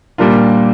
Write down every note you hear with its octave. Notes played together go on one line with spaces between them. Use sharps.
A#2 G3 A#3 D4 F4